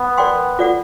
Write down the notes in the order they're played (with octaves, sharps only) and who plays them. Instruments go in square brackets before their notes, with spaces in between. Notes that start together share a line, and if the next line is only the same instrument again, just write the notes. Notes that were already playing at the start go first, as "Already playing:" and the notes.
Already playing: [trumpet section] B3
[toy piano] A#4 D5 G5 C6
F4 A4 D5 F#5